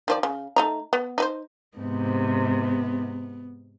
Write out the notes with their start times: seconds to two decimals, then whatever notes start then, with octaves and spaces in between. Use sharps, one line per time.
0.08 D#3 F3 D5
0.23 C#3
0.56 A3 D#4 A#5
0.93 B3
1.18 D#4 B4 C5
1.78 G#2 C3 B3